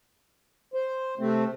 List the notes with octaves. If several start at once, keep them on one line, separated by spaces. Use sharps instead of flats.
C5
C3 A3 C4